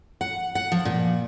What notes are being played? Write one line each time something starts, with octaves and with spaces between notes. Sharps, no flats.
F#5
F#5
F3
A#2